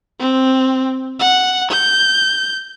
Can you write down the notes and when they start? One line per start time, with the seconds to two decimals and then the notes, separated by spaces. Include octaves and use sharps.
0.20 C4
1.20 F#5
1.71 G6